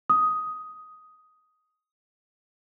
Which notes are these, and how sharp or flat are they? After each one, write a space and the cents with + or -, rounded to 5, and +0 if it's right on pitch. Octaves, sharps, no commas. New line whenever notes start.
D#6 +10